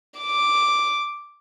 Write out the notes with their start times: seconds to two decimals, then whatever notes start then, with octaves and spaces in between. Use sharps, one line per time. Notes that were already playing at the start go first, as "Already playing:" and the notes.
0.19 D6